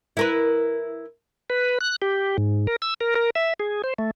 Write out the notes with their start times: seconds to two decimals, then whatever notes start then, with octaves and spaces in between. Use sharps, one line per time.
0.17 E4 A#4 B4
1.50 B4
1.81 F#6
2.02 G4
2.38 G#2
2.67 A#4
2.82 E6
3.01 A#4
3.15 A#4
3.35 E5
3.60 G#4
3.84 C5
3.98 A3